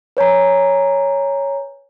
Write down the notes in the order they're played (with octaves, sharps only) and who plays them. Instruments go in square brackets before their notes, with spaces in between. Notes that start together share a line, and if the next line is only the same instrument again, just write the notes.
[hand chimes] B4 C#5 G#5 A#5